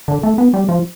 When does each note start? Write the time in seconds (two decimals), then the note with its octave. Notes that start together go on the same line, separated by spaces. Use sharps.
0.08 D3
0.23 A3
0.38 B3
0.54 G3
0.69 F3